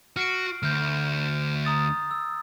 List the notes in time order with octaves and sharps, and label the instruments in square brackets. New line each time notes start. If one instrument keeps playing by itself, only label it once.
[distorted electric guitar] F#4 [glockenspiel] F6 C7 D7
[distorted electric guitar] D2 [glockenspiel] F6 G6
[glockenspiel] A#5 D#6 A6
E6